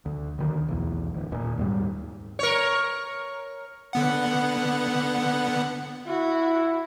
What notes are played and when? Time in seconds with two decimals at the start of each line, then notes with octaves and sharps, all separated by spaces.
0.06 D2
0.39 D2 D#3
0.68 B1 E2
1.14 D1
1.31 D#1 A#2
1.57 D#2 G#2 G3
2.39 A#4 C#5
3.93 D3 B3 F#5
6.08 E4 F#4